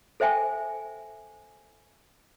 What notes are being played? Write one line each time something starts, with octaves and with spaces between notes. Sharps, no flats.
A4 C5 E5 G5 G#5